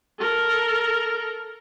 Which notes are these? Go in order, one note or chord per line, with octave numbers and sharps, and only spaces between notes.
A4 A#4